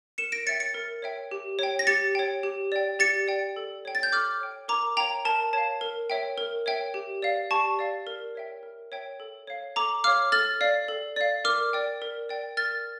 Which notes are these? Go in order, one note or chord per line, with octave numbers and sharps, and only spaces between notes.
A#4 C#7 E7
A#6 D7
C#5 E5 G5 A6 C#7
A6 C#7
A#4
C#5 E5 G5
G4
C#5 G5
A#6
G4 A6 C#7
C#5 G5
G4
D5 G5
G4 A6 C#7
D5 G5
A4
C#5 G5
A6
G6
A4 D6 F6
C#5 G5
A#4 A#5 D6
C#5 F5 G5 A#5
A#4 A5
C#5 F5 A5
A#4
C#5 E5 G5
A#4
C#5 E5 G5
G4
D5 F5
G4 A5 C#6
D5 F5
A#4
C#5 E5 G5
A#4
C#5 E5 G5
A4
C#5 F5
A4 A#5 D6
C#5 F5 D6 F6
A4 F6 A6
D5 F5
A4
D5 F5
A#4 D6 F6
D5 G5
A#4
D5 G5
A#4 F6 A6